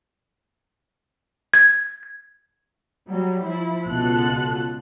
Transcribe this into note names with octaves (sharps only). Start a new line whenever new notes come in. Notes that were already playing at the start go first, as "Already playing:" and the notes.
G#6
F#3 G3
F3 E4
C#2 B2 F4 A4 F#6